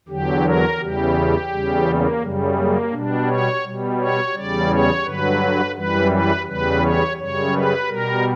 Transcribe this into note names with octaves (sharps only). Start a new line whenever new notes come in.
E2 D3 F#3 G4
A#4
E2 C#3 E3 G3 G4
E2 C#3 G3
A#3
F#2 C#3 G3
A#3
B2 G3 D4
C#5
B2 G3
C#5
E2 C#3 G3 D5
C#5
G2 D3 F#3 B4
F#2 E3 G3 B4
B4
E2 C#3 G3 B4
C#5
F#2 C#3 G3 C#5
B4
B2 G3 A#4